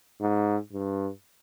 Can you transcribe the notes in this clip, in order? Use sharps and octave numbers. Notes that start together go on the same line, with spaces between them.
G#2
G2